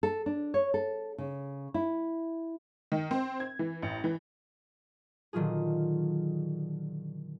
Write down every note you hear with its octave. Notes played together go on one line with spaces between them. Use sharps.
A4
D4
C#5
A4
C#3
E4
D#3
C4
G#6
E3
A1
E3
A#2 D3 D#3 F#3 F4 G#4